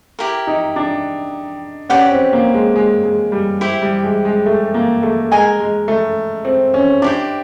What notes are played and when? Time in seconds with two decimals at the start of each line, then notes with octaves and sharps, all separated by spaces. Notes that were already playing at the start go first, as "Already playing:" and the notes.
0.19 E4 G4 A#4
0.47 D#4
0.76 D4
1.89 C#4 G4 B4 D5 F#5
2.11 C4
2.33 A#3
2.54 G#3
2.76 G#3
3.04 G#3
3.32 G3
3.61 E4 G4 C5 E5
3.82 G3
4.03 G#3
4.25 G#3
4.46 A3
4.74 A#3
5.03 A3
5.31 G#3 A#4 D#5 G#5
5.60 G#3
5.88 A3
6.45 C4
6.74 C#4
7.02 D4 E4 G4 C5